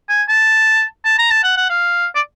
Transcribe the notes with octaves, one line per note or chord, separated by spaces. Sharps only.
G#5
A5
A5
A#5
A5
F#5
F#5
F5
D5